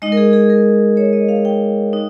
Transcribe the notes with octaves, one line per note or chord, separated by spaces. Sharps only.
G#3 D#4 D#5
A#4
G#4
G#4
A#4
C#5
D#5
F5
G5
D#4